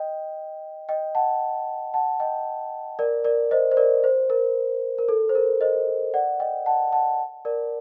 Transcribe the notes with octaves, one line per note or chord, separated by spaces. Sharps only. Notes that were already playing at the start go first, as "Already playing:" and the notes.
Already playing: D#5 G5
D#5 G5
F#5 A5
F#5 A5
D#5 G5
A#4 D5
A#4 D5
C5 D#5
C5
A#4 D5
C5
A#4
A#4
A4
C5
A#4
C5 D#5
D5 F#5
D#5 G5
F#5 A5
F#5 A5
A#4 D5